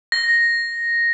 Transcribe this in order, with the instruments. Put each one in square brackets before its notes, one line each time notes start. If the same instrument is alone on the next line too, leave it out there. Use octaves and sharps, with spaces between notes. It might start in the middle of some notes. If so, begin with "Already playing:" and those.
[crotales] A#6